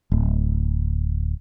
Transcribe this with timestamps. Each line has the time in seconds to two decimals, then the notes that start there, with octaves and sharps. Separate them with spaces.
0.12 D1